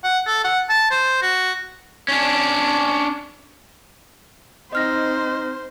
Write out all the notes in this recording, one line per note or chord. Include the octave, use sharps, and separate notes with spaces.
F#5
A4
F#5
A5
C5
F#4
C#4 D4
C4 D#4 C5 D#5 F6 A#6